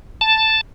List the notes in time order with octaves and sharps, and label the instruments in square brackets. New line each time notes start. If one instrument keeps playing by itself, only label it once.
[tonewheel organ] A5